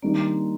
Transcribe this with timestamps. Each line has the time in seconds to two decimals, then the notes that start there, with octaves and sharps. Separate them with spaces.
0.02 D#3 G3 A#3 D4
0.14 C4
0.24 A#3